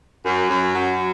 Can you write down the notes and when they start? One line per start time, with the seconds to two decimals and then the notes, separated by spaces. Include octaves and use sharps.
0.25 F#2
0.50 F#2
0.74 F#3